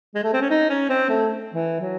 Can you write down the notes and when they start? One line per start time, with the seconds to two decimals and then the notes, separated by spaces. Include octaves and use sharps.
0.15 G#3
0.24 A3
0.33 C4
0.41 C#4
0.50 D#4
0.70 C#4
0.89 C4
1.09 A3
1.54 E3
1.80 F#3